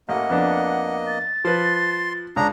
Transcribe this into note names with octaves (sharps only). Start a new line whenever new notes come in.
A1 A#3 D#5 F#5
F2 B3 D4
A6
F3 B4 C6
C#2 D4 A#5 D#6